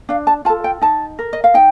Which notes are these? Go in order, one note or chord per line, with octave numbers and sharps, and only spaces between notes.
D4 F5
A5
F4 A4 A5
G5
D#4 A5
A#4
D#5
F5
D#4 G5